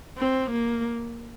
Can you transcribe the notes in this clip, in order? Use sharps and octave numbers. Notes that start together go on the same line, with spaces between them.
C4
A#3